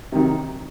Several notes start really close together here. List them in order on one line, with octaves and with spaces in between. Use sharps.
C3 D#3 F#3